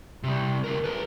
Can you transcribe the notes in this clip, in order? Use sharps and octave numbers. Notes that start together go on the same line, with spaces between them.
C3 G3
D2 A#4
A4 B4